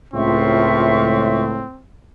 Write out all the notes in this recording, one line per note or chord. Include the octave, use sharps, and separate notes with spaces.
C#2 A2 C4 F4 E5 C#6